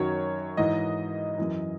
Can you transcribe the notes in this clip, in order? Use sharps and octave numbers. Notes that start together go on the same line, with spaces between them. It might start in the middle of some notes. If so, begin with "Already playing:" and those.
Already playing: F#2 D#3 F#3 C#5
G#2 E3 D#5
F#2 E3